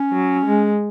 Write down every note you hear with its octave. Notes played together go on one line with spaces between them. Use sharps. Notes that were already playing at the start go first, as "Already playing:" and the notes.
Already playing: C#4
F#3
G#3